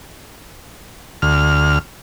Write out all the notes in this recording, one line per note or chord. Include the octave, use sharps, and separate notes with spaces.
D2 F6